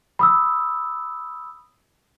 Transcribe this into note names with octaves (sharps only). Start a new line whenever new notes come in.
B5 D#6 E6